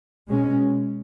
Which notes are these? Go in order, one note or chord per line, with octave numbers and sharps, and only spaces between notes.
B2 G#3 C#4